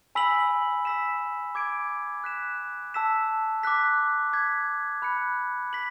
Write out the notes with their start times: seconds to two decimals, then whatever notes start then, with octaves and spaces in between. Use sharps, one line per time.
0.15 G#5 B5 E6 B6 F#7
0.85 E6 B6 E7
1.55 D6 G#6 D7
2.24 F#6 B6 E7
2.94 A5 E6 B6 E7
3.63 D6 F#6 B6
4.33 D6 G#6 B6
5.02 B5 F#6 C#7
5.73 B6 F#7